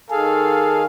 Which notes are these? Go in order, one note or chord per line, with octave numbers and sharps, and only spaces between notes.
D#3 G#4 A4 F5